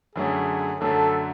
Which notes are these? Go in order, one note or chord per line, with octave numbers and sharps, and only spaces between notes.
F#2 D3 F#3 A3 C#4 G#4
F#2 D3 F#3 A3 C#4 A4